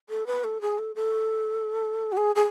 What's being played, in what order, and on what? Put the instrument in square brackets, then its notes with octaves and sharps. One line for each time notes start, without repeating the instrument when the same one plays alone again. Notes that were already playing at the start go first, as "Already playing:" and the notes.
[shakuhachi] A4
B4
A4
G#4
A4
A4
F#4
G#4
G#4